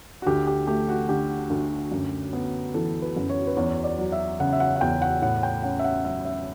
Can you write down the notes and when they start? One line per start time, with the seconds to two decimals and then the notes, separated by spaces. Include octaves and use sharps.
0.22 F#4
0.26 D2 G4
0.47 G4
0.67 A3 G4
0.89 F#4
1.09 D3 G4
1.50 D2
1.92 F#2
2.33 B3
2.74 E3 A4
3.02 B4
3.16 F#2
3.30 C#5
3.47 B4
3.57 E2 C#5
3.84 D5
3.98 F#3
4.12 E5
4.40 C#3 F#5
4.53 E5
4.60 F#5
4.76 F#5
4.81 E2 G5
5.02 F#5
5.22 A2 F#5
5.43 G5
5.63 C#4 F#5
5.79 E5
5.84 F#5
6.05 F#3 E5
6.25 E5